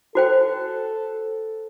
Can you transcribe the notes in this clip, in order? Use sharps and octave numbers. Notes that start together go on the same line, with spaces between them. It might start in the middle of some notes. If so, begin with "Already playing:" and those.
F#4 A4 C5 G5